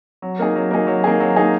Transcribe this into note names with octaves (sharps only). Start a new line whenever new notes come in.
F#3
A#3 D#4 G#4
F#3
A#3 D#4 G#4
F#3
A#3 D#4 G#4
F#3
A#3 D#4 G#4